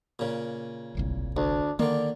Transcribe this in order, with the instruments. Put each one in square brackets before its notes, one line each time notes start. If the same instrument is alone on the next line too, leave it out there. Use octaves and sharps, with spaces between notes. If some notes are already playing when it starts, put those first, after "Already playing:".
[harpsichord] A#2 C#3
[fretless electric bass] D1 G1 C2
[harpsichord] D2 [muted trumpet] D4
[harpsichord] D3 D#3 [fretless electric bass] A#3 [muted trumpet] D5